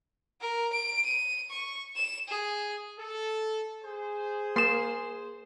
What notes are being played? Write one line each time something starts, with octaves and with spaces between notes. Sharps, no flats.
A#4
D7
D#7
C#6
E7
G#4
A4
G#4 C5
A#3 C6 E7